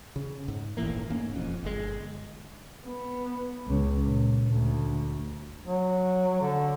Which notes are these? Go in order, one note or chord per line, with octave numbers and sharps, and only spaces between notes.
C#3
G#2
D#1 A1 E3 A#3
G#2 A#3 C#4
E1 F2
G1 G#3
B3
C#2
A#2
D2
F#3
D3